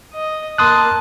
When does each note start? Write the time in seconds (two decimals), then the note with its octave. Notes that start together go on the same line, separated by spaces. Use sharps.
0.13 D#5
0.58 A#3 A5 C6 D#6 F#6